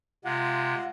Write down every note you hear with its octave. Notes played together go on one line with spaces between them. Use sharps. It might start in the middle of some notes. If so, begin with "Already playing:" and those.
C3 G#3 F4 F#5